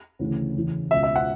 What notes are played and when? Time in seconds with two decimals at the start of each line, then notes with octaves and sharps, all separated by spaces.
0.19 D2 C#3 E3
0.56 E2 C#3 E3
0.91 C#2 B2 E5
1.03 E5
1.16 F#5